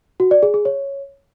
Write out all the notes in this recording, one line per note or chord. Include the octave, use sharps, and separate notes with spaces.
F#4
D5
G#4
G#4
C#5